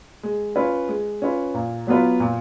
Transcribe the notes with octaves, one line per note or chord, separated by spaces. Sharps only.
G#3
C#4 F4 B4
G#3
C#4 F4 B4
A#2
F#3 B3 F4 B4
A#2